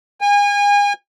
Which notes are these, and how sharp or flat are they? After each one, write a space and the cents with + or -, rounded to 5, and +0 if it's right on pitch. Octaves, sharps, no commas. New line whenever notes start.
G#5 -35